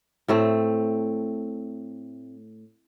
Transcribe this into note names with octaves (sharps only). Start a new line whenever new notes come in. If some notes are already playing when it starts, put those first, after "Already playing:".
A2 A3 C4